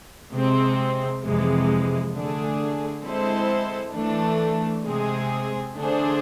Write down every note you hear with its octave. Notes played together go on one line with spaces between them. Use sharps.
C3 G#3 C4
F2 C3 E3 G#3
D3 A3 D4 G#4
G#3 C4 E4 A4 C5
E3 A3 D4
C3 G#3 C4 G#4
D3 A3 D4 G#4 C5